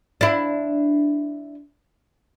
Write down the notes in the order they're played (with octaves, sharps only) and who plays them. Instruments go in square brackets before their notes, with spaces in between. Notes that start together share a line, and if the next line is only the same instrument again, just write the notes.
[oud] D4 E4